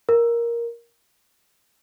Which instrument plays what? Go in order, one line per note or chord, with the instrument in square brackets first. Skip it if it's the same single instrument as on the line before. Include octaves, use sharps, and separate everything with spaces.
[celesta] A#4